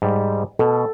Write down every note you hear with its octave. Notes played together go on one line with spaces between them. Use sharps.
G#2 G3
B2 A4